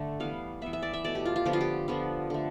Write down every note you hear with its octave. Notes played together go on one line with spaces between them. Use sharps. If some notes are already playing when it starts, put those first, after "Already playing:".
Already playing: D3 A3
E3 G3 B3 F5
E3 B3 E5
E5
D5
E5
B2 A3 D5
G4
F4
F4
D3 F3 B3 G4
F4
G4
D3 F3 B3
D3 A3